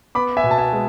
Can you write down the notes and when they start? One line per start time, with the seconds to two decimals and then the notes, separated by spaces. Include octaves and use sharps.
0.15 B3 B5 D6
0.37 E5 G#5
0.43 B2
0.51 A5
0.58 E5 G#5
0.73 G#3